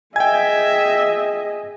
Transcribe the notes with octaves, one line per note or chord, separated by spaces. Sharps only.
G#4 D#5 E5 G5 G#5 G#6